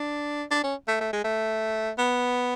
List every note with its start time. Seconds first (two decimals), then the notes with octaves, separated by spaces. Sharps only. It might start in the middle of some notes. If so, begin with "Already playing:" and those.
Already playing: D4
0.51 D4
0.64 C#4
0.88 A3
1.01 A3
1.13 G#3
1.24 A3
1.98 B3